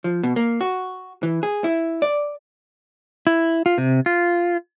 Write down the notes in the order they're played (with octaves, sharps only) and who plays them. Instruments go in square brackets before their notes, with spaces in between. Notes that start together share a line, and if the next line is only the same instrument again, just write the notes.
[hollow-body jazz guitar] F3
B2
A#3
F#4
E3
G#4
E4
D5
[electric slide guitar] E4
F4
C3
F4